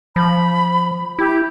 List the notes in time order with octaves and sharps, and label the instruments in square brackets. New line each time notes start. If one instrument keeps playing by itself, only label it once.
[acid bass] F3 [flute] B5
[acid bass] E4 [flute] G4